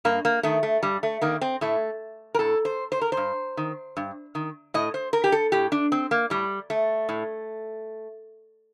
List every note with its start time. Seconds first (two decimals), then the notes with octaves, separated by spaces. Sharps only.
0.05 G2 A#3
0.25 A#3
0.43 D#3 A3
0.63 A3
0.83 G2 G3
1.03 A3
1.22 D#3 A#3
1.41 C4
1.61 A2 A3
2.34 A#4
2.39 A2 A4
2.65 C5
2.92 C5
3.01 A#4
3.12 C5
3.17 G2
3.57 D#3
3.97 G2
4.35 D#3
4.74 A2 D#5
4.94 C5
5.13 A#4
5.24 G4
5.32 A4
5.52 A2 G4
5.72 D4
5.92 C4
6.11 A#3
6.30 A2 G3
6.70 A3
7.09 A2